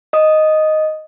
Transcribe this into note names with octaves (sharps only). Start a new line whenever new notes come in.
D#5 D#6